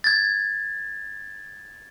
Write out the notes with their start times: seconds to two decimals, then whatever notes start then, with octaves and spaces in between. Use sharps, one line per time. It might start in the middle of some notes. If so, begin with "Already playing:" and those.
0.04 G#6 A6